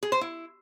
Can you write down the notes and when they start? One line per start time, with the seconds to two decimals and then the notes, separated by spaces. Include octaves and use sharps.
0.03 G#4
0.12 C5
0.21 E4